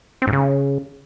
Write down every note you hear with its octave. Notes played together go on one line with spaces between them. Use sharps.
C4
G#2
C#3